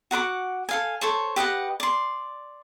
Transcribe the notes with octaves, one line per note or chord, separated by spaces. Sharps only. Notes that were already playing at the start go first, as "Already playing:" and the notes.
F#4 F#5 B5 D6
A4 F5 G#5
A4 C5 C#5
G4 B4 D#5 F#5
D5 C6